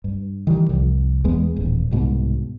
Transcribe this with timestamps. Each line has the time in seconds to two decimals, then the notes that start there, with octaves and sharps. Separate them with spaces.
0.04 G2
0.47 D#3 E3 G3
0.69 C2 F2
1.24 E2 G#3 B3
1.56 D#1 A1
1.91 C2 G#2 B2